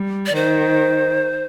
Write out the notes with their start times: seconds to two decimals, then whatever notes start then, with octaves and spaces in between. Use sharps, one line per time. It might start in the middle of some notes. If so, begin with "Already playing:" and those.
Already playing: G3
0.26 D5
0.35 D#3 C5